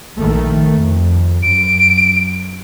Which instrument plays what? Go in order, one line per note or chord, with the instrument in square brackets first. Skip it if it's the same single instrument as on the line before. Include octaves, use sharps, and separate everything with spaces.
[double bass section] A#1 D#3 A3
F2
[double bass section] F#2 [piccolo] D7